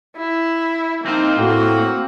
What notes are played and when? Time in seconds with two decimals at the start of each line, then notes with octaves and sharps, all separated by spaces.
0.17 E4
1.06 A#3 C4 D#4 F4 C5
1.38 A2 F#4